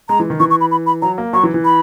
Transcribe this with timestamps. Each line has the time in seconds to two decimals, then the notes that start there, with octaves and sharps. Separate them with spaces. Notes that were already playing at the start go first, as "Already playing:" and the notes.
0.09 G#3 A#5
0.19 E3
0.30 D#3
0.40 E3 C#6
0.50 C#6
0.61 B5
0.71 B5
0.86 B5
1.02 F#3 A#5
1.18 A#3
1.33 F#3 C#6
1.43 E3
1.54 E3
1.65 B5